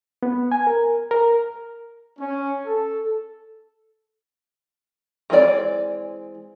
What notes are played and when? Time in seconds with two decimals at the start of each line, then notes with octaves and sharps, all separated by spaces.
0.23 B3
0.52 G#5
0.67 A#4
1.11 A#4
2.19 C#4
2.66 A4
5.30 E3 G#3 C4 F#4 D5